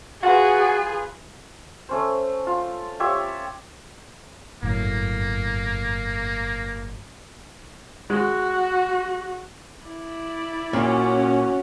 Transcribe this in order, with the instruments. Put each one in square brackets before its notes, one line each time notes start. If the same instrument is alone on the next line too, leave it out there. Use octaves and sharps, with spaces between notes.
[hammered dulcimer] F4 B4 [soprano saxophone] F#4 [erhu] G#4
[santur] A3 C#4 C5
F4
F4 G4 C#5 E5
[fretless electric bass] G1 F#2 A2 [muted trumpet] A#3
[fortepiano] G#3 [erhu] F#4
[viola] E4 D5
[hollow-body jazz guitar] A#2 [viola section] C#4 [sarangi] F#4